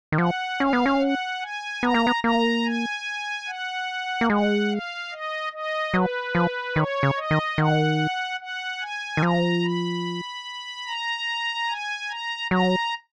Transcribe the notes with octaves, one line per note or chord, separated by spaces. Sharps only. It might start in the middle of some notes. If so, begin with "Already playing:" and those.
D#3
F3 F#5
C#4 F5
B3
C#4
F#5
G#5
B3 A#5
A#3
B3
A#3 A#5
G#5
F#5
A#3
G#3 F#5
F5
D#5
D#5
F#3 B4
F3
D#3 C#5
C#3
D#5
D#3
D#3 F#5
F#5
G#5
D#3
F3 A#5
B5
A#5
G#5
A#5
F#3 A#5